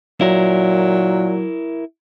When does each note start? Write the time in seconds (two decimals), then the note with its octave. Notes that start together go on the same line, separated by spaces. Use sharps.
0.21 A#2 F#3 E4 A#4